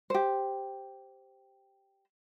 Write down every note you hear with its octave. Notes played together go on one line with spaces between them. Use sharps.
G4 C5